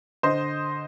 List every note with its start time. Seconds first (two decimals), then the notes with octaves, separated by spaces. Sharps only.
0.23 D3 C5 D#5